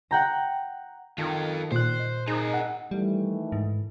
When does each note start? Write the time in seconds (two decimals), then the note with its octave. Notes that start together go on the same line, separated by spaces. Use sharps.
0.11 F#5 G5 A#5
1.18 D#3 F4 A4
1.72 A#2 C5 F#6
2.27 D#4 G#4 A#4
2.54 F#5
2.91 D#3 E3 G3 A3
3.52 G#2